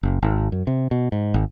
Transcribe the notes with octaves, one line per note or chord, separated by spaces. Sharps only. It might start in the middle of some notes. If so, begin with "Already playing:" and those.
F#1
G#1
F#2
C3
B2
G#2
G#1